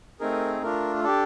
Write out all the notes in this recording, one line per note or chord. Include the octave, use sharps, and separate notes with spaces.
A3 C4 D#4 G#4 A#4
A3 D4 F4 A#4
D4 G4 A4